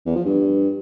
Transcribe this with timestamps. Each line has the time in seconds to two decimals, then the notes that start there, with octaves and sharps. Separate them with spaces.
0.06 E2
0.16 F3
0.25 G2